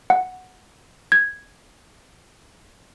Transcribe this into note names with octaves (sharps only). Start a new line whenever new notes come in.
F#5
G#6